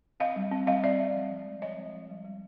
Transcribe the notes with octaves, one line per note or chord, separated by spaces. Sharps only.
C4 D#5 F5
G3
C4
G3 D#5 F5
C4 D5 E5
G3
F3
F3
G#3
C4 C#5 D#5
F3
F3
G3
G3